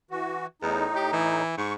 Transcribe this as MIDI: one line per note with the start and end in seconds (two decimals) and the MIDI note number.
0.11 0.46 52
0.11 0.46 66
0.62 0.85 40
0.62 1.42 45
0.62 1.42 63
0.96 1.10 67
1.13 1.53 52
1.58 1.75 44
1.58 1.74 85